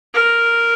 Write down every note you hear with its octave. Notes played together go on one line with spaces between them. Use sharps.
A#4